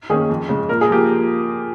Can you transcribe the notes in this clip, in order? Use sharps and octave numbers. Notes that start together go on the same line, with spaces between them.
D#3 A#3 C#4 G#4
F2
C#3 G#3
A#2 A#4
G#4
F3 A#3 G4